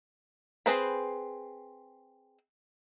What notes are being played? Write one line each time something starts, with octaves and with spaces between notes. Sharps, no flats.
C4 G#4 B4 C5 B5